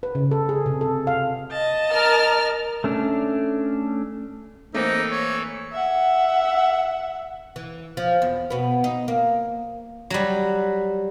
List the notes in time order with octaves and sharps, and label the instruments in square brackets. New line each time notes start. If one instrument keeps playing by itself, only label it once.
[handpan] B4
C#3
A4
G#4
C3
A4
F5
[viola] D#5 A5
[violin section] A#4 F6
[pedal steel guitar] A3 C#4 D4
[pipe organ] E3 A4 [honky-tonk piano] A3 A#3 C4 [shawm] D#4
[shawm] C#5
[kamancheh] E5 F#5
[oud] E3
F3
E2
B2 B3
D#4
A#3
[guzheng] F#3 G3